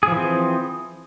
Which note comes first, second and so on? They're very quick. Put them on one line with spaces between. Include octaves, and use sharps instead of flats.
G#4 F3 E3 C4